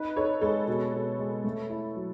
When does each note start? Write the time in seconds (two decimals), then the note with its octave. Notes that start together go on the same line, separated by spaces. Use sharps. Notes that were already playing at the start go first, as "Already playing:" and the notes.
Already playing: D#4 B4
0.16 D#4 A4 C#5
0.41 G#3 A4 C#5
0.67 B2
0.93 B2
1.19 G#3
1.44 A3
1.70 E4
1.96 F#3